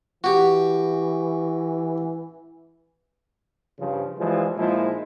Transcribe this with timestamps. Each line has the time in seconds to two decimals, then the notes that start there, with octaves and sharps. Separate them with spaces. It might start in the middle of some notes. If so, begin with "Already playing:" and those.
0.24 E3 F#4 G4
3.79 G2 C#3 F3
4.18 E3 F3 G3 G#3
4.57 A#2 F3 G#3 D#4 E4